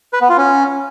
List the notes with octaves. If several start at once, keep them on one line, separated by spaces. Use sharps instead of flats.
B4
B3
F4
C#4